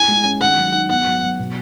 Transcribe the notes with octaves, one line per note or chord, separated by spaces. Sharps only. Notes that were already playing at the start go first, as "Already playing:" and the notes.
Already playing: E4 G#5
G#3
C#4
D#3 F#5
F#3
D#4
B3 F#5
F#3
F#3
B2